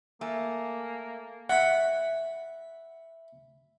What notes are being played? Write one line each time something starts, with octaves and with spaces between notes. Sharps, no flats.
A3 A#3 G#5
E5 F#5 B5